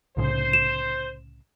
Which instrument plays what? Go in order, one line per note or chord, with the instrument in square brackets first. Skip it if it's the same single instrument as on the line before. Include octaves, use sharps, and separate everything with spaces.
[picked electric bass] C2 A2 C#3 [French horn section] C5
[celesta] E7